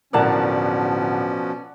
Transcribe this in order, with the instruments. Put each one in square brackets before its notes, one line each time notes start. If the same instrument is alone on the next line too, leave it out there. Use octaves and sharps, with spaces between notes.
[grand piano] D1 A#4 [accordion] B2 F3 C#4 [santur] D5 F#5 A5